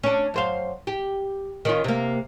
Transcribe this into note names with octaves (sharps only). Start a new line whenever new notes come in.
C#4 D4
F#2 C5 F5
G4
D#3 C#4 F4
C3 A#3